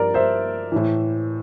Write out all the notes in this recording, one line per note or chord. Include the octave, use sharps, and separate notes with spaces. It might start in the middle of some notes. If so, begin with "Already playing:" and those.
Already playing: G2 F3 A#4 D5
C5 E5
A2 E3